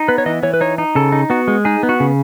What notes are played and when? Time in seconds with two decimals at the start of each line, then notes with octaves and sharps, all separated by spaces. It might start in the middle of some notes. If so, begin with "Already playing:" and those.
Already playing: D#4
0.08 B3 B4
0.18 C#5
0.26 E3 D#5
0.43 E3 C#5
0.54 B4
0.61 D#4 C#5
0.78 D#4
0.95 C#3 A4
1.12 D#4
1.30 B3 F#4
1.48 G#3
1.65 D#4 G#4
1.83 B3
1.89 F#4
2.00 C#3